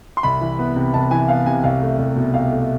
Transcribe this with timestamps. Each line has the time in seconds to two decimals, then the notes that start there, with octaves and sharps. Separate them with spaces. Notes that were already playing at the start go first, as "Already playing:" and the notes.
0.17 C6
0.23 C2 B5
0.41 E3
0.59 B3
0.76 C3
0.94 C2 A5
1.11 E3 G#5
1.28 B3 F5
1.46 C3 G#5
1.64 C2 F5
1.81 A3
1.99 C2
2.16 B2
2.34 C2 F5
2.51 A3